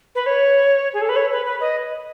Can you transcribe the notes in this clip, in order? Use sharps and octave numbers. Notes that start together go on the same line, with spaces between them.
B4
C#5
G#4
A4
B4
C#5
B4
B4
D#5